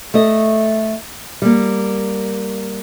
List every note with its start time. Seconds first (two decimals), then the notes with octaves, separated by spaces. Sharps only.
0.14 A3 D#5
1.42 G3 A#3